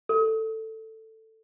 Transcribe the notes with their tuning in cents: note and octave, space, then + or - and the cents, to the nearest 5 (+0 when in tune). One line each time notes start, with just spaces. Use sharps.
A4 +10